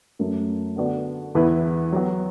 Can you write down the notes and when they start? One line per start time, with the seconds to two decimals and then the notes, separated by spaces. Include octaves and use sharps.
0.19 F#2 F#3 A3
0.76 D3 B3 F#4 D5
1.35 E2 E3 B3 E4 B4
1.92 F#3 B3 F#4